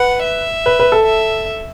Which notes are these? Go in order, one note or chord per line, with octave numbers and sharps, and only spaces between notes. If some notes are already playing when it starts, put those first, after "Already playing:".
Already playing: B4 F#5
E5
B4
B4
A4
E5